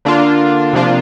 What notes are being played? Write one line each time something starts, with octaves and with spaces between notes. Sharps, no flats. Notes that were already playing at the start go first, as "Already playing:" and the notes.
D3 A#3 D4 F4
C3 F3 A#3 D4 F4